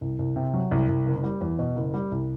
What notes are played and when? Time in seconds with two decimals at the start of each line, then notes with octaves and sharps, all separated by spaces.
0.01 C2
0.19 C2
0.36 C3
0.54 F#3
0.71 C2
0.89 C2
1.06 F#1
1.23 G3
1.41 E2
1.59 B2
1.76 F#1
1.94 G3
2.11 C2